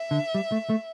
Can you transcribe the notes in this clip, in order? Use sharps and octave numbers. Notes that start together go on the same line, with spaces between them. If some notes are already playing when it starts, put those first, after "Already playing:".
Already playing: E5
D3
G3
A3
A3